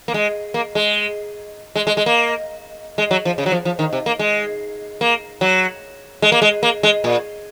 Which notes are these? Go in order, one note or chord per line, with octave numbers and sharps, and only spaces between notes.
A#3
G#3
A#3
G#3
G#3
G#3
G#3
A#3
G#3
F#3
F3
C#3
F#3
F3
F3
D#3
C3
A#3
G#3
A#3
F#3
G#3
A#3
G#3
A#3
G#3
A#2